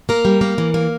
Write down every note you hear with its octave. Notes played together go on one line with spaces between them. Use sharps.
A#3 A#4
G3
A#3
E3
A#3